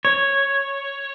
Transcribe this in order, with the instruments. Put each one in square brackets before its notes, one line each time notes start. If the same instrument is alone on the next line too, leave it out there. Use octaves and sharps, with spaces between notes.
[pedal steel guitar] C#5